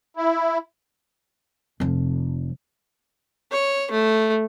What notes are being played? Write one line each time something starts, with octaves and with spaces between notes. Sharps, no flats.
E4
F1 F3
C#5
A3